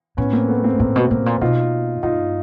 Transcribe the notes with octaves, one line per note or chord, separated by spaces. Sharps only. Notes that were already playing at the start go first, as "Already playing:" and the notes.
A2 B3 C#4
A#3 C4
A3 B3
A#3 C4
A2 A#3 C4
B2
A2 A#3 C4
A#2
B2 D#4 F4
G2 D#4 F4